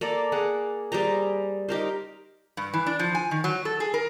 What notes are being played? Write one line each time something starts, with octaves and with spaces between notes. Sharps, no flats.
A#3 A4 D5 A#5
A#3 G#4 F#5
G3 G#4 C5 A#5
D#4 G4 A#4 C5
G2
E3
D4
F3
G#5
D#3
F#3
A4
G#4
A#4